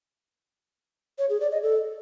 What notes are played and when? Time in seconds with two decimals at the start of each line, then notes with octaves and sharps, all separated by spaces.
1.19 C#5
1.30 G#4
1.41 D5
1.52 D#5
1.62 A4